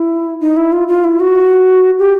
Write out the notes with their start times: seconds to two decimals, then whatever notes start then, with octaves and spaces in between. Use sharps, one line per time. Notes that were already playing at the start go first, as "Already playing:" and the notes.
Already playing: E4
0.41 D#4
0.57 E4
0.72 F4
0.88 F4
1.04 E4
1.20 F#4
1.99 G4